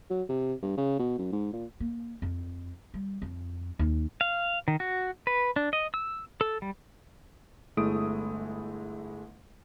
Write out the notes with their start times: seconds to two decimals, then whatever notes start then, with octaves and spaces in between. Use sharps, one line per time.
0.10 F#3
0.29 C3
0.63 G2
0.77 C#3
0.99 B2
1.18 F#2
1.32 G#2
1.53 A#2
1.80 A#3
2.22 F2
2.94 G3
3.22 F2
3.79 D#2
4.21 F5
4.68 D#3
4.80 F#4
5.27 B4
5.56 D4
5.73 D#5
5.94 E6
6.41 A4
6.62 G3
7.77 G1 G#3 A3 E4 D#6 D7